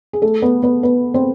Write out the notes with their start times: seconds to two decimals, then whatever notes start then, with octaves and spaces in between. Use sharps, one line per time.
0.13 G#4
0.22 A3 A4
0.42 B3 B4
0.63 B3 B4
0.83 B3 B4
1.14 C4 C5